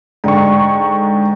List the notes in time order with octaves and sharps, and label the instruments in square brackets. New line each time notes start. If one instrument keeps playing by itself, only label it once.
[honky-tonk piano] G#2 D3 C#6 [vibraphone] D5 G5